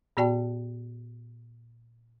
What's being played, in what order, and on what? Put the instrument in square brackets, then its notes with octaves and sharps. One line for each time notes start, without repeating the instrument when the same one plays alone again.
[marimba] A#2 B3 F#4 D5 G5 A5